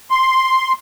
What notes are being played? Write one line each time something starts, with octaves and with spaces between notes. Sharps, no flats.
C6